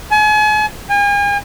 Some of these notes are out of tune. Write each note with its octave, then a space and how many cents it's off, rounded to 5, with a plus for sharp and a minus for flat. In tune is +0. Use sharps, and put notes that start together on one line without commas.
G#5 +40
G#5 -40